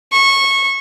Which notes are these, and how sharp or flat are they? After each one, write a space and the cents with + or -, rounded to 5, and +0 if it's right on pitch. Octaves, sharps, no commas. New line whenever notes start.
C#6 -20